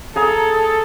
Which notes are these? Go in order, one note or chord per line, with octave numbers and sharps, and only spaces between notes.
G#4 A4 A#5